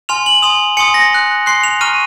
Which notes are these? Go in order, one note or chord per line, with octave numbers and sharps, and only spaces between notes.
G#5 C6 F6 F7
F#7
G#5 C6 D#6 F7
G#5 C6 D#6 C#7
A#6
C6 F#6
C6 F#6 C7
F7
A#5 C#6 F6 D#7